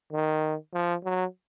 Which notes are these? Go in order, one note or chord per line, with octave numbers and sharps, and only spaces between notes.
D#3
F3
F#3